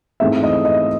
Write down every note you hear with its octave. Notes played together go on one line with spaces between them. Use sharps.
G#2 E3 A3 C4 E5
D#5
D#5